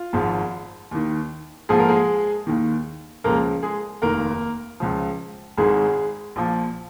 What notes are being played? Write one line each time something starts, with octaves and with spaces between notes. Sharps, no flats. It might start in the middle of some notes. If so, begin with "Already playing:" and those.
Already playing: F4
G#1 G#2 F3
D#2 D#3
A#1 G#2 F3 G#4
A#4
G#3 G#4
D#2 D#3
C#2 C#3 F3 A#3 A#4
G#3 G#4
F1 D#2 D#3 A#3 A#4
C#2 C#3 F3
G#1 G#2 D#3 G#3 G#4
A#1 A#2 F3